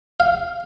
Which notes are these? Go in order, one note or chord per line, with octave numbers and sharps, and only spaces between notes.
F5